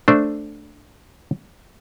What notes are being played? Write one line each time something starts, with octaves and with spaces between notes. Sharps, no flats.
A3 D4 C5